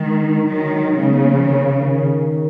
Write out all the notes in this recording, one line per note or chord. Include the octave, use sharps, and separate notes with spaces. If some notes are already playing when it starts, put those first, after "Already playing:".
Already playing: D#3 G#3
D#3 F#3
C#3 G#3
B3
A#3
F3
D#3
D#3